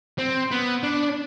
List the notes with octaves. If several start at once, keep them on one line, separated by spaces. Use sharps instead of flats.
C4
B3
D4